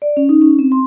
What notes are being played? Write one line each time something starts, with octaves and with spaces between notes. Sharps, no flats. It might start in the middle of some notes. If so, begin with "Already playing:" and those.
D5
C#4
D#4
C#4
C4
C6